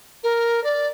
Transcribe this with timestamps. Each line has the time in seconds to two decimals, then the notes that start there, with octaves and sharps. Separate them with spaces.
0.23 A#4
0.63 D5